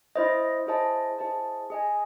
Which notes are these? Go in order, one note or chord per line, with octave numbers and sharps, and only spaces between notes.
E4 C5 D#5
E4 G#4 C5 D#5 A5
E4 G#4 C5 D#5 A5
G#4 D#5 G#5